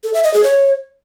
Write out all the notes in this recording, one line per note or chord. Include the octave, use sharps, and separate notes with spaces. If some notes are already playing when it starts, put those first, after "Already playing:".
A4
E5
D#5
G#4
C#5